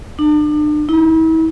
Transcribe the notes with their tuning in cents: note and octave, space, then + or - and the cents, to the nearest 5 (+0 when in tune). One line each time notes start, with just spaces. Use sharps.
D4 +40
E4 -40